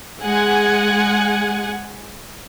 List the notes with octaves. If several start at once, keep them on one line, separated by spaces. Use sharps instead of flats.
G#3 F#5 G#5